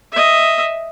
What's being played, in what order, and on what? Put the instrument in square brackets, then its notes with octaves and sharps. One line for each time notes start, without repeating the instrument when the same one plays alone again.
[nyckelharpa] D#5 E5